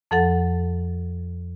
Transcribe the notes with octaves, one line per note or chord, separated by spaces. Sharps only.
F2 F3 A4 F#5 A6